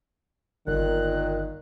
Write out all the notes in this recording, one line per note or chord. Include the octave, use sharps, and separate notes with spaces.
G1 A#2 D#3 F#6